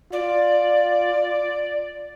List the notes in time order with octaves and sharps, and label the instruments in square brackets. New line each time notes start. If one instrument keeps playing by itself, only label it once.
[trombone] F4 [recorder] D5